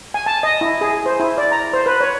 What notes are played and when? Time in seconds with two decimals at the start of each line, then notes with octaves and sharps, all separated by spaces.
0.14 G#5
0.26 A5
0.43 D#5
0.61 E4
0.81 G#4
1.06 C5
1.20 E4
1.38 D5
1.52 A#5
1.73 C5
1.86 B4
2.00 C#5